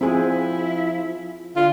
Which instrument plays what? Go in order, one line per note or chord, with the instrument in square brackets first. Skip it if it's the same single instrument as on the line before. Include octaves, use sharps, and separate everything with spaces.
[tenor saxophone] F3 [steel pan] C4 G#4 [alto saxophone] E4
[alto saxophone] D3 [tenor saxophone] F4